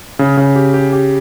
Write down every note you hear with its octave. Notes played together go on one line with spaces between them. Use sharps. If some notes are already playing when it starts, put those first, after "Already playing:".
C#3
C#3
G4
G4
G4